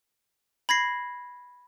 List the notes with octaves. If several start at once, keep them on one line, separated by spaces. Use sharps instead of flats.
B5 G#6 A#6 C7